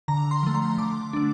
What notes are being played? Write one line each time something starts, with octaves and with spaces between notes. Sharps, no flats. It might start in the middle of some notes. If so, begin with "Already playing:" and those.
D3 A#5
C6
F3 A3
C6
D3 D6
A3 D4